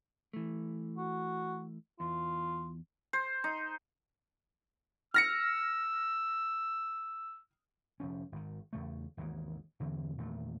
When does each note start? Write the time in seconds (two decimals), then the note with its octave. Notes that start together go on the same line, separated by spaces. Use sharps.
0.33 E3 A3
0.97 F#4
2.00 E2 F4
3.13 C5
3.44 D#4
5.14 E6 F6 A#6 C#7
8.00 F1 F3 C#4
8.32 G#1 D#3
8.73 E2 C#3 A3
9.17 G#1 D#2 G#2 E3
9.80 E2 D3 E3 C4
10.18 E2 A#2 D#3 A3